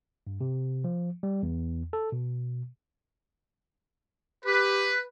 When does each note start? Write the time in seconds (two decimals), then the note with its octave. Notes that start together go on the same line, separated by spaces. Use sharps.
0.27 G2
0.41 C3
0.84 F3
1.23 G3
1.43 E2
1.93 A4
2.12 B2
4.45 G4 B4